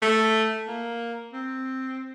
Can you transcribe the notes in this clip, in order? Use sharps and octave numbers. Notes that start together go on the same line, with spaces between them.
A3
A#3
C4